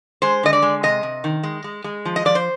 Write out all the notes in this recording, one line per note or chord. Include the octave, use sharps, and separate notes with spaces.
G#3 C5
D3 D#5
D5
G#3
C3 D#5
C3
D#3
G#3
G#3
G#3
F3
D#5
F3 D5
C5